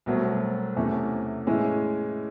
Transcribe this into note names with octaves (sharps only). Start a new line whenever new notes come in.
C2 B2 F#3 A3 C4
E2 C3 E3 A3 C#4
A2 E3 G#3 C#4 E4